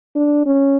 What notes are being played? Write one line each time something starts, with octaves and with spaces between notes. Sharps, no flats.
D4
C#4